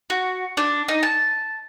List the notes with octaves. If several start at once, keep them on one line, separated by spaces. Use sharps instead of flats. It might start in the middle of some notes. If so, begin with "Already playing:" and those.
F#4
D4
D#4
A5